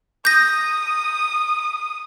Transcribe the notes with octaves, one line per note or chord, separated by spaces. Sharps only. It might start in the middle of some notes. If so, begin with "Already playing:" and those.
D#6 G6 A#6